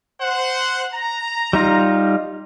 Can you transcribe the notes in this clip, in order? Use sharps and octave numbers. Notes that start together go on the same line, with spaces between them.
C5 F#5
A#5
G3 D#4 F4